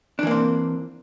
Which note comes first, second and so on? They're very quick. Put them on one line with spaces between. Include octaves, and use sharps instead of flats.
D4 E3 A#3 C4